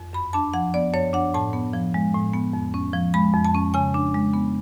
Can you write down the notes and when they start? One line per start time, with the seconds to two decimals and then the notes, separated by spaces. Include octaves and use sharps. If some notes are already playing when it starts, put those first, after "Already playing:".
Already playing: F2
0.13 F#2 B5
0.33 D4 A5
0.54 F3 F#5
0.74 B3 D5
0.93 F#2 C#5
1.13 D4 F#5
1.34 A2 A5
1.53 B3
1.73 F3
1.94 G#3
2.15 A2
2.33 B3
2.54 F2
2.74 C#4
2.93 F3
3.14 G#3 B5
3.33 F2
3.45 A5
3.55 C#4
3.74 C#3 G#5
3.94 D4
4.14 G#3
4.34 B3